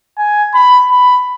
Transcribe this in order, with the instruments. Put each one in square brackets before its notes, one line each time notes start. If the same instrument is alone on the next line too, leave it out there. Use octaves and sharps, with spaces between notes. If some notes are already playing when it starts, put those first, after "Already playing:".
[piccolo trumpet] G#5
B5
B5